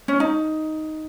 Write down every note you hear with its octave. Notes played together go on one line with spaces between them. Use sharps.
C#4
D#4